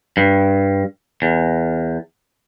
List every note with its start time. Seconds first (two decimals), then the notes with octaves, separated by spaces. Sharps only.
0.17 G2
1.22 E2